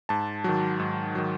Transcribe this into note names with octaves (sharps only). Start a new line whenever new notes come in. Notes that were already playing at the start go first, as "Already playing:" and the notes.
G#2 A5
D#3 F#3
G#2
D#3 F#3